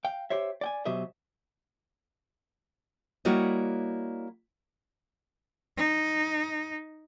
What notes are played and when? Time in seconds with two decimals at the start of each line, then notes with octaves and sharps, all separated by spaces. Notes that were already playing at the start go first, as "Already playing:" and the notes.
0.05 F5 G5
0.30 G4 C5 C#5 E5
0.61 D5 G5 G#5
0.85 B2 F#3 G4 C5 D#5 E5
3.25 G3 A#3 E4 F#4 C#5 D#5
5.77 D#4